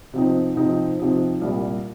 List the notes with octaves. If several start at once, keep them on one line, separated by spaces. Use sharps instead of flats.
C3 F3 C4 D#4
C3 F3 C4 D#4
C3 F3 C4 D#4
C2 A#2 G3